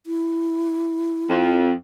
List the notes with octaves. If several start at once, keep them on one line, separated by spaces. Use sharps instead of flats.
E4
F2